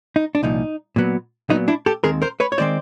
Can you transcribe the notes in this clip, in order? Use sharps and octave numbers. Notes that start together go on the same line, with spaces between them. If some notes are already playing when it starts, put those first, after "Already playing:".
D#4
D4
C2 A#2 F3 D#4
A#2 F#3 B3
A#2 F#3 B3 D#4
D4 E4
G4 A4
D#2 D#3 G#3 C4 G#4 A#4
A#4 C5
B4 C#5
C#5
D#3 G#3 C4 C5 D5